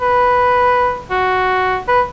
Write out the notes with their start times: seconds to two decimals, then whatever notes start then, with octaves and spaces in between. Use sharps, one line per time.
0.01 B4
1.11 F#4
1.88 B4